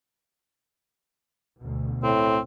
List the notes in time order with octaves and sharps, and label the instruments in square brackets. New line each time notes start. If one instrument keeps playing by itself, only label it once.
[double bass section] D2 B2
[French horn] A2 [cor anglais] C4